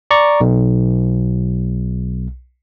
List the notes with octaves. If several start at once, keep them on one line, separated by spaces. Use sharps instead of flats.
D5 A#5 C#6
B1